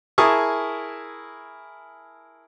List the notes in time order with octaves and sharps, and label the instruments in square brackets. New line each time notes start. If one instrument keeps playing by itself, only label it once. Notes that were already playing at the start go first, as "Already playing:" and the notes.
[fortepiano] E4 G#4 A#4 A5 C#6 D#6